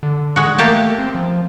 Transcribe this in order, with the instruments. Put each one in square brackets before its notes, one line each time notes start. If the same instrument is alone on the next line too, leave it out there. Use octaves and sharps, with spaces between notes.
[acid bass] D3
[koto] G#3 F#4
[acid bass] A3 [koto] A#3 G4 A5
[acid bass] C4
F3